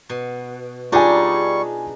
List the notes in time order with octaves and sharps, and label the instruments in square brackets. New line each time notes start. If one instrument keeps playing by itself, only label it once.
[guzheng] B2
[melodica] G3 C#6 [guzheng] D4 D#4 G#4 [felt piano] F4 G#5